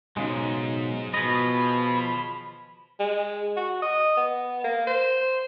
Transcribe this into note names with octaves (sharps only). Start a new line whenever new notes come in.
B1 G#2 C#3 G#3
B2 F3 G#4 D#5 B5
G#3
F#4
D#5
B3
A#3
C5